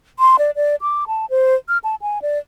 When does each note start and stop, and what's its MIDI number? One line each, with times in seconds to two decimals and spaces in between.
0.19 0.36 84
0.39 0.51 74
0.56 0.76 74
0.81 1.04 86
1.07 1.26 81
1.30 1.55 72
1.69 1.78 89
1.84 1.95 81
2.02 2.22 80
2.22 2.39 74